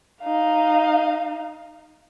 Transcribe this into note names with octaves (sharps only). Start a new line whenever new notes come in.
D#4 F5